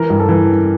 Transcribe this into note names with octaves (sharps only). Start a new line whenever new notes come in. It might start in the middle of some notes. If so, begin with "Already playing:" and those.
Already playing: E3 A#4
G2
A4
E3